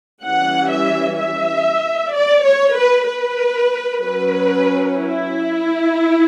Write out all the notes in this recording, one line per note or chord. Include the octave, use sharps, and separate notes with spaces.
E3 G3 C#4 F#5
E5
E5
D5
C#5
B4
B4
F#3 C#4 B4
E4